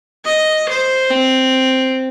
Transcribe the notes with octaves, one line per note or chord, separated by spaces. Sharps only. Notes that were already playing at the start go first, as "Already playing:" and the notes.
D#5
C5
C4